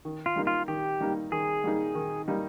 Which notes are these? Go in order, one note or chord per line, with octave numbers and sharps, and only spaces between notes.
D#3
F4
G3 A#3 D#4
F4
D#3 G4
G3 A#3 D#4
D#3 G#4
G3 A#3 D#4
D#3
G3 A#3 D#4